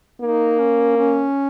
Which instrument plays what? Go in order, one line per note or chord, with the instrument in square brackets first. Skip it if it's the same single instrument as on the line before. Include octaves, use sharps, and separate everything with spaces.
[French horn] A#3 [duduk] D#4
[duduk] C#4
C#4